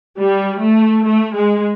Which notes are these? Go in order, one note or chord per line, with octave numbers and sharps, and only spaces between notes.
G3
A3
A3
G#3